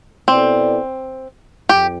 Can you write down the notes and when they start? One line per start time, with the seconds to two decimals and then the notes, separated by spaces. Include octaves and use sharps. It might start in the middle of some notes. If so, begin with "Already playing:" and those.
0.28 B2 B3 C4 E4 A4 D5
1.69 F2 G4